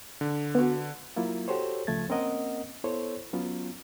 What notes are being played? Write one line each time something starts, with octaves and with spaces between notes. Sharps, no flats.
D3
B3 F#4
F#3 A#3 E4 F4
F#4 G4 A4 C5 C#5
C#2 C#3 F3 A3 G#6 A6
A#3 C4 C#4 A#4 D#5 F#5
B3 E4 A4 C5 C#5
F#3 B3 C#4 F4